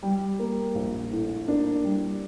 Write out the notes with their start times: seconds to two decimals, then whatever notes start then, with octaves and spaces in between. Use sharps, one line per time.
0.03 G3
0.39 A#3
0.75 A#1
1.11 A2
1.48 A#3 D4
1.84 G3